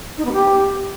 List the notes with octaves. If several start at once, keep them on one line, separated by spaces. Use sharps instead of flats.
D#4
B3
G4